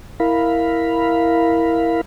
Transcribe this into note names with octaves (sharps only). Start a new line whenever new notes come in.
E4 A#4 F5 B5